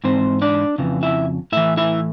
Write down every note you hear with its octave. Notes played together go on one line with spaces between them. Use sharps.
G#2 E3 C4 C5
D4 D5
F2 C#3 E3
E4 E5
A2 E3 E4 E5
E4 E5